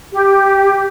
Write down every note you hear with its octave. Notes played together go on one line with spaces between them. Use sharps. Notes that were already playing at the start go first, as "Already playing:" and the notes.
G4